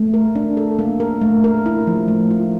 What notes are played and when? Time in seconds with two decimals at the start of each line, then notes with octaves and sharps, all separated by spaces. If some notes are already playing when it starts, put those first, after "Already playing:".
Already playing: A3
0.14 A#4
0.35 D4
0.57 A4
0.79 A#3
1.00 A#4
1.21 A3
1.44 A#4
1.66 E4
1.87 F3
2.08 A3
2.31 F4